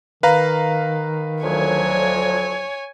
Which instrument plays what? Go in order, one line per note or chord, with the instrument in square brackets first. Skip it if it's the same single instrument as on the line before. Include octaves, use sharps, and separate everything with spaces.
[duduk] D#3 [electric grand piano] B4 F5 A#5
[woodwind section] D2 F3 F#3 [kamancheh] C#5 G#5